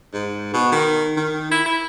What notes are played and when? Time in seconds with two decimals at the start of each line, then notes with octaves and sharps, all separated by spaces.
0.13 G#2
0.53 B2
0.72 D#3
1.17 D#3
1.51 E4
1.66 E4